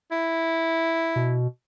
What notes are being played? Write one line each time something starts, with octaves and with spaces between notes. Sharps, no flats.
E4
B2